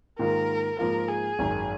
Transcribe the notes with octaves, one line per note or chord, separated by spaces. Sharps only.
G#2 D#3 A#3 F4 A#4
G#2 F3 A#3 F4 A#4
G#4
G#1 F#2 D#3